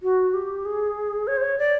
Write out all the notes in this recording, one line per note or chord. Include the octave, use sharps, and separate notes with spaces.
F#4
G4
G#4
C#5
C5
C#5
D5